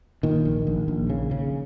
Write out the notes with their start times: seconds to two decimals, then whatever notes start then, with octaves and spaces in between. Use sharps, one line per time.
0.23 A#2 D#3
0.45 A#1
0.67 A#1
0.88 A#1
1.10 C#3
1.31 C#3